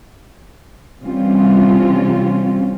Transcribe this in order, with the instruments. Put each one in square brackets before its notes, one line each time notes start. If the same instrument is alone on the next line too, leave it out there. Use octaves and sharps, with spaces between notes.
[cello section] C3 E3 G3 C4 C#4 F4